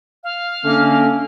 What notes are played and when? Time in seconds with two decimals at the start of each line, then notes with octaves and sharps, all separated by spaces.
0.24 F5
0.65 D3 A3 A#3 C#4